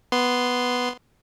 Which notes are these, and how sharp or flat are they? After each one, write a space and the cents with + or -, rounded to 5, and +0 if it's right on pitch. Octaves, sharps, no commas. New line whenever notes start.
B3 +0 C6 -5